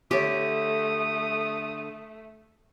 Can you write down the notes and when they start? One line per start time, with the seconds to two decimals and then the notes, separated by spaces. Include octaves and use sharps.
0.11 D3 A3 G4 A4 C#5 D#6